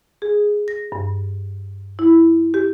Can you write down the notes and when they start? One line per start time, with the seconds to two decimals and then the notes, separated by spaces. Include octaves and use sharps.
0.22 G#4
0.68 A#6
0.92 G2
1.99 E4
2.54 G4